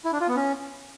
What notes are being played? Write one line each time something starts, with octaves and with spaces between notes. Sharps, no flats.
E4
D4
F4
B3
C#4